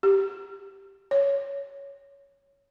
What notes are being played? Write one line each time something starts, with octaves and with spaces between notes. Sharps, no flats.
G4
C#5